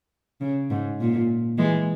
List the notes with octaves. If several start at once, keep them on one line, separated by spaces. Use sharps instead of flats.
C#3
G#2
A#2
E3 G#3